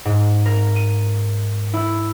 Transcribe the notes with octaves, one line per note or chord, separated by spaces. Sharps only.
G#2
A#4
D#7
E4